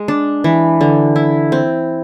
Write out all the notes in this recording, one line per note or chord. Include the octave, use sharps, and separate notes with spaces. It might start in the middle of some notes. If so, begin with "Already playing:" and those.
Already playing: G#3
D4
E3
D3
E4
C4